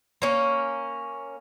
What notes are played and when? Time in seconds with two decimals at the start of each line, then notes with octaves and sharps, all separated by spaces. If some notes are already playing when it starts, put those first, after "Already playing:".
0.22 A#3 C#4